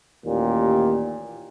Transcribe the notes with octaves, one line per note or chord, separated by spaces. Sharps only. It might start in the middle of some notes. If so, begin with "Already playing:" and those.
A1 D#2 A#2 G4